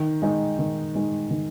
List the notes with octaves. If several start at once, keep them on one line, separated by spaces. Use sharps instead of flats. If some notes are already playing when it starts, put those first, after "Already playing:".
Already playing: D#3
G#3 D#4
D#3
G#3 D#4
D#3